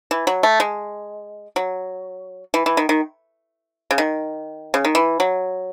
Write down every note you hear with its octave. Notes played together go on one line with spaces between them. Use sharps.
E3
F#3
A3
G#3
F#3
E3
E3
D#3
D#3
C#3
D#3
C#3
D#3
E3
F#3